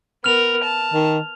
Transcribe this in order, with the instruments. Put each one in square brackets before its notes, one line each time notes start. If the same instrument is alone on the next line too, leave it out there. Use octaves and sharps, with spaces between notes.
[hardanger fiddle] B3 A#4 [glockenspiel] F6 F7
[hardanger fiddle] A5
[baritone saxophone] D#3